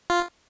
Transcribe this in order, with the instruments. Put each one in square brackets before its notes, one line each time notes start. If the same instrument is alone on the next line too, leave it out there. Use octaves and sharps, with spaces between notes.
[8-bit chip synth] F4